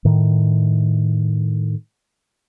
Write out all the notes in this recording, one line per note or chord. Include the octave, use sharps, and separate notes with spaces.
A2 D#3